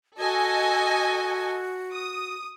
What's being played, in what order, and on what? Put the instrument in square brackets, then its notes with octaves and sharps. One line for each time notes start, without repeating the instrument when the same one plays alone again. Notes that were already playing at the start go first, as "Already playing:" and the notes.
[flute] F#4 [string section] A4 D#5 G#5
[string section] D#6